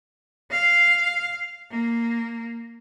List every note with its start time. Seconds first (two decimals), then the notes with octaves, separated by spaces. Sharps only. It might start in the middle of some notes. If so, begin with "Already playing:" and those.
0.51 F5
1.71 A#3